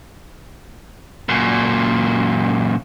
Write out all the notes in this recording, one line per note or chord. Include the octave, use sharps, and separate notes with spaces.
F#2 A#2